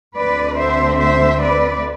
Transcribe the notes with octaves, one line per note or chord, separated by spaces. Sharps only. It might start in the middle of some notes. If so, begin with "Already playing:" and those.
D2 D3 A3 C4 B4 D5
C5 E5
C5 E5
B4 D5